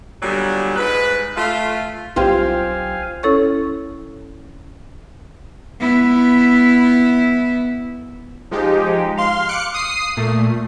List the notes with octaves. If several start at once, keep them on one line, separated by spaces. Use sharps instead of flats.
A#2 D3 F#3 G3 B3
G#2 B4
A3 F4
B1 C4 F4 G4 C5 F5 G#5
C#4 E4 A4 C#5 C#6
B3 E4
F3 G#3 D#4 G4
F5 C6 F6
D6 F#6 C#7
D#6 C7
A#2 A3